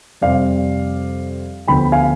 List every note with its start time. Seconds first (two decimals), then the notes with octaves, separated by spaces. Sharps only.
0.21 F2 C3 G3 C4 D5 F5
1.68 D2 D3 F3 B3 G5 B5
1.92 F5 G#5